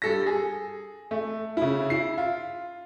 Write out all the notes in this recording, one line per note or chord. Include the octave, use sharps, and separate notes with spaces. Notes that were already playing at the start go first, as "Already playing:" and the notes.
G2 A4 A#6
G#4
A3
C#3 E4
E4 C7
F4